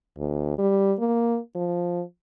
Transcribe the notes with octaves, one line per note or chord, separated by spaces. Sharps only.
D2
G3
A#3
F3